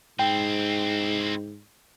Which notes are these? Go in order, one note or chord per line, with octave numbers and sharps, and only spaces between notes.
G#2 C4 E4 G5